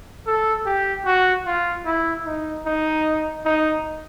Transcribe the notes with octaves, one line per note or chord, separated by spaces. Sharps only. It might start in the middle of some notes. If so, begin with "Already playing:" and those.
A4
G4
F#4
F4
E4
D#4
D#4
D#4